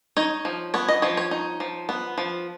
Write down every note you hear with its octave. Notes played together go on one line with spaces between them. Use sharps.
D#4 C#5
F3
B3 C#5
D#5
F3 C#5
C#5
D#4
F3
B3
F3